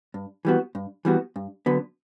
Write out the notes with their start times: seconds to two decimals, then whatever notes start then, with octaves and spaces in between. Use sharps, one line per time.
0.14 G2
0.45 E3 G3 B3 F#4
0.75 G2
1.05 E3 G3 B3 F#4
1.36 G2
1.66 D3 F#3 B3